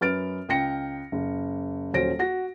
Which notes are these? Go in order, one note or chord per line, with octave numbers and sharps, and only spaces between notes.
F#2 B4 F6 A6 D7
C#2 G5 A#6 C#7
F#1
D#1 F#3 C#4 C5 A#6 D7
F#4 A#6